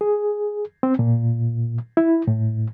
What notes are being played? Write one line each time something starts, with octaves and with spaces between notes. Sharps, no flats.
G#4
C4
A#2
E4
A2